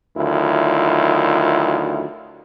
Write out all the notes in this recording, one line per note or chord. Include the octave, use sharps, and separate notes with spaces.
D2 D#3 F#3 E4 F4